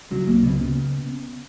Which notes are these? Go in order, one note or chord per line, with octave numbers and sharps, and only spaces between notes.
C#3 F#3
C#2 A#3
C#3 B3
C#3